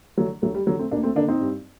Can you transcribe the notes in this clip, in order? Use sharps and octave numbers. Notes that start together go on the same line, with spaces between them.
D3 F#3 A3
D2 F#3 A3
G3
D3 F#3
A3 C4
D2 A#3 D4
A3 C4
D3 A#3 D4
C4 D#4
G2